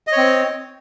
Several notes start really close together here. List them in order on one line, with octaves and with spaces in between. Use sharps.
D#5 C#5 C4